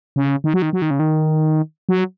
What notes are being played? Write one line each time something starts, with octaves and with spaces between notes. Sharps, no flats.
C#3
D#3
F#3
D#3
F#3
D#3
C#3
D#3
F#3